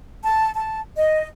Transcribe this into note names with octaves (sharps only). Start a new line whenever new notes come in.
A5
A5
D#5